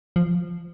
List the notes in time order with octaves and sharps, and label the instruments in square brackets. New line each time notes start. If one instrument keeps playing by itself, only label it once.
[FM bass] F3